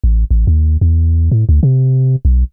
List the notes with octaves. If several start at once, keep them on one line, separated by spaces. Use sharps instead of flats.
A1
A1
D#2
E2
A2
D2
C3
B1